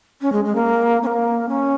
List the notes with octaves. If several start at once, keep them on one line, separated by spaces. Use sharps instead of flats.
C#4
G#3
G#3
A#3
C#4
A#3
C#4